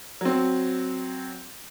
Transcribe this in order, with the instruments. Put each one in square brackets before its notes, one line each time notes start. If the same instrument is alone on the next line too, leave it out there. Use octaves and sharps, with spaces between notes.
[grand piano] F#3 C4